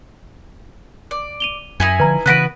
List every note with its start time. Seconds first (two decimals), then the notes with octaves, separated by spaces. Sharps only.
1.11 D5
1.40 D#7 F7 G7
1.80 F#2 D#4 E4 G#5
2.00 D3 F3 B4 A#5
2.26 C#3 E3 B3 F#4 B4 F#6 B6 D7